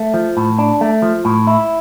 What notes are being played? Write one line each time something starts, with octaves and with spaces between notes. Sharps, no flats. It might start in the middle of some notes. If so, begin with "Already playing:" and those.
Already playing: A3
F3
A2
D4
A3
F3
A2
E4